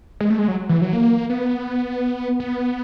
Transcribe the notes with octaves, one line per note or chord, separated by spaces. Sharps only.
G#3
A3
G#3
F#3
E3
F#3
A#3
B3
B3